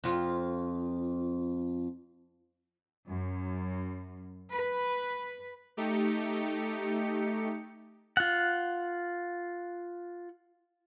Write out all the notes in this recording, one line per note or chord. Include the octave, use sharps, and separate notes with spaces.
F2 F4
F#2
B4
A3 D#4 G4 C#7
F4 F#5